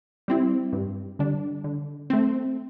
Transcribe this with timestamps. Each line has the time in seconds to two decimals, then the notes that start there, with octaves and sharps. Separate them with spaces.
0.28 G3 C4 E4
0.73 G2
1.19 D3 G3 D4
1.64 D3
2.10 A3 C4